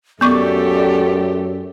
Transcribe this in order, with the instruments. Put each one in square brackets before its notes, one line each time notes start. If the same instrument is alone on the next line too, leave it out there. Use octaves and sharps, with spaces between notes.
[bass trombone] F#2 [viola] A3 G4 [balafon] B3 C#6 D6 [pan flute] D5